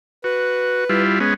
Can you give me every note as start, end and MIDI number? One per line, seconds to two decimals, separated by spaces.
0.24 0.84 66
0.24 1.01 71
0.89 1.19 55
0.89 1.19 64
0.89 1.19 65
1.20 1.34 56
1.20 1.34 59
1.20 1.34 61